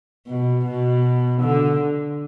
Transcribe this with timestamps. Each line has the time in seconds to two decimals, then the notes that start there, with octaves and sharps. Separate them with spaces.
0.27 B2
0.66 B2
1.42 D3